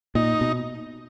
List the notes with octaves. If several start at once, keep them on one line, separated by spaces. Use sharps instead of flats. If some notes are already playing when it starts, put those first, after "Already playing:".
A#2 D#4
B2